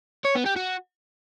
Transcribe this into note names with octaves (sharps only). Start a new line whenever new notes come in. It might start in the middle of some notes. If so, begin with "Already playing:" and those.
C#5
B3
G4
F#4